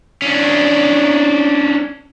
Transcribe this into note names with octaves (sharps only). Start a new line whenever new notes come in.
C#4 D4